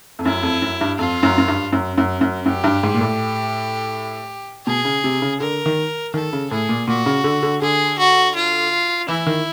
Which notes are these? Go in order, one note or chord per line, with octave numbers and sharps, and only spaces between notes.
F2
F#2 E4
F2
F#2
G2
F2 F4
F#2
F#2
G2
F#2
F#2
F#2
F#2 G4
G2
G#2
A#2
A2
B2 G#4
C#3
C3
C#3
D3 A#4
D#3
D#3 A4
C#3
A2 G#4
A#2
A#2 F#4
C#3
D3
D3
D3 G#4
F#4
F4
E3 E4
D#3